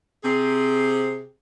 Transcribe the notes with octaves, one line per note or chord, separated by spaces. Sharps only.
C3 C4 G4 G#4